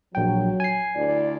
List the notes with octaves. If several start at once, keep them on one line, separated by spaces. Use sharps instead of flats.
A#1 F#3 G5
G#5 C7
D2 E4 D5